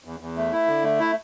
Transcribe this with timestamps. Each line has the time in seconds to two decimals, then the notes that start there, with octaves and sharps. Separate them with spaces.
0.04 E2
0.20 E2
0.37 A3
0.52 E4
0.68 D3
0.84 A3
1.00 E4